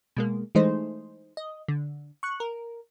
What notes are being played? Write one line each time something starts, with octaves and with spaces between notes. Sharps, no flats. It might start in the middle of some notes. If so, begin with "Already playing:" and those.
B2 G#3 A#3
E3 G#3 A3 D#4 C5
D#5
D3
C#6 F#6
A#4